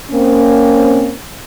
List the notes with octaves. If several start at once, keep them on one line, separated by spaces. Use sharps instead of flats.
A#3 C4 C#4